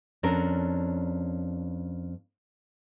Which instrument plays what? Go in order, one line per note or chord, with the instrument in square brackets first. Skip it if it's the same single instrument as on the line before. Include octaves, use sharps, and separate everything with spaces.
[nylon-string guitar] F2 C#4 D4 A#4